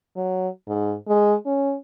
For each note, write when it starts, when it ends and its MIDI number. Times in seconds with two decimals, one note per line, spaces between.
0.16 0.48 54
0.68 0.94 44
1.08 1.35 56
1.46 1.75 61